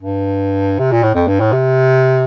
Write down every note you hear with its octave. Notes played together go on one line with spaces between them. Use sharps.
G2
C3
A#2
A2
F2
G2
A2
C3